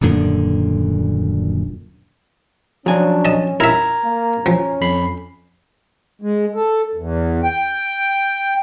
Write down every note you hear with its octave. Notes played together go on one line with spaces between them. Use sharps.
D#1 F#2 A#2 D3
F3 F#3 C#4 D4 G#5
D#5 A5
E4 A#4 E5 A#5 F6 G#6
A#3
F3 C#4
F2 B5 C7
G#3
A4
E2
G5